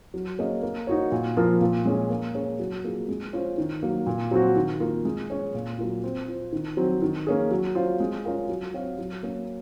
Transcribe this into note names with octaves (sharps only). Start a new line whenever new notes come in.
F#3
A#3 C#4 G#4 D#5
A#3
D#4 F#4 C#5
A#2
F3 A#3 F4 A#4
A#2
G#3 C#4 F4 G#4
A#3
C#4 G#4 C#5
F#3
A#3 F4 G#4
G#3
C#4 F4 C5
D#3
F#3 A#3
A#2
F#3 C4 F#4
D#3
A#3 F4 A#4
G#3
C#4 G#4 C#5
A#2
F#3 A#3 F4
C4
F4 C5
D#3
F#3 C4
D#3
A#3 C#4 G#4
F#3
C#4 F4 C5 F5
G#3
C#4 F4 A#4 F5
F#3
C4 F#4 C#5 F5
F#3
A#3 C#4